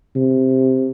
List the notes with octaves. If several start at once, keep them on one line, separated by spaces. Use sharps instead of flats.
C3